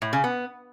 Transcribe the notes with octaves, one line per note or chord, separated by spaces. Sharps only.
A2
C#3
B3